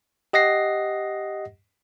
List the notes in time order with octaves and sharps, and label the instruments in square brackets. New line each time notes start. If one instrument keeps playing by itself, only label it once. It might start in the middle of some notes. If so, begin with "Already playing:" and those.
[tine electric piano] G4 D#5 F#5 A#6 C7